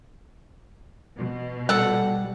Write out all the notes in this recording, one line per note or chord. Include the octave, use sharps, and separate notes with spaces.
B2
G3 A4 F#5